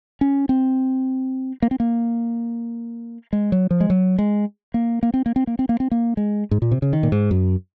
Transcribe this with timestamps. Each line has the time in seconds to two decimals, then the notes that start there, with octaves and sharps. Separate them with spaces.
0.21 C#4
0.49 C4
1.62 A#3
1.71 C4
1.80 A#3
3.33 G#3
3.52 F#3
3.71 F3
3.81 G#3
3.90 F#3
4.18 G#3
4.74 A#3
5.03 A#3
5.14 C4
5.26 A#3
5.36 C4
5.47 A#3
5.59 C4
5.69 A#3
5.80 C4
5.91 A#3
6.17 G#3
6.51 G#2
6.62 A#2
6.71 C3
6.82 C#3
6.93 D#3
7.03 A#2
7.12 G#2
7.31 F#2